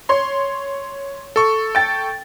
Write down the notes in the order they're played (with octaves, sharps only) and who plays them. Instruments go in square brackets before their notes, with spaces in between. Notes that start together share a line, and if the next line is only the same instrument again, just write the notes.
[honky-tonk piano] C#5 C6
[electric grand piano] A4 C#6
[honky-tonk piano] G5 A6